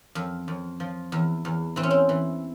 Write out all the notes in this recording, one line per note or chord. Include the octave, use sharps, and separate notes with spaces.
F2
F2
F3
E2
E2
E3 C4
C#4
C4
E3